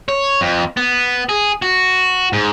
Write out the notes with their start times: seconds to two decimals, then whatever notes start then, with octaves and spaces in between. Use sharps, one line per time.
0.09 C#5
0.41 F2
0.77 B3
1.29 G#4
1.62 F#4
2.33 G#2